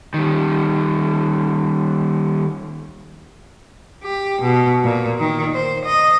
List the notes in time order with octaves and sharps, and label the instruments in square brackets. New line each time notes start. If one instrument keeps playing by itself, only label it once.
[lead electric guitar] D#3 G3
[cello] G4
B2
A#2
D#3
C5
D#5